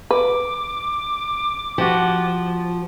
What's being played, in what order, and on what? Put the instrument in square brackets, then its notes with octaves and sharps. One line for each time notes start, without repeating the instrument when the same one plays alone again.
[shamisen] B4 [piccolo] D6
[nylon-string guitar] F3 [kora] F#4 G4